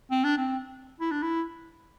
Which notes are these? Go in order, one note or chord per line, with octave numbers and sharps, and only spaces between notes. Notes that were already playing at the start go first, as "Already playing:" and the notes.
C4
D4
C4
E4
D4
E4